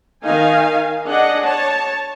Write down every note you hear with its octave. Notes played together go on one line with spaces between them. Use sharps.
D#3 D#4 F5 G#5
D4 G#4 D#5 F#5
C#5 A5